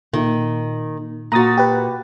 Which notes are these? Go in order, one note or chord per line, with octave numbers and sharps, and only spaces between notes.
A#2 D#3
A#2 F#4 A#5 D#6 A6
G4 B4